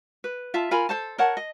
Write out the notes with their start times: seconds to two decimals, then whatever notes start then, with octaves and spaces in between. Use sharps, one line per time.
0.24 B4
0.54 F4 E5 A5
0.71 F4 A#4 G#5 B5
0.89 A4 C5 A5
1.18 A#4 C#5 F#5 A5
1.37 D#5